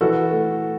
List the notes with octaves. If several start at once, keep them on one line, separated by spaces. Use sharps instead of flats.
E3 F#4 A4
A3